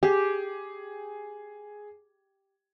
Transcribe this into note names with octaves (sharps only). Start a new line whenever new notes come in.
G4 G#4